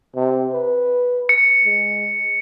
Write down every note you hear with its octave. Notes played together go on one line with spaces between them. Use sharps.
C3
B4
C#7
G#3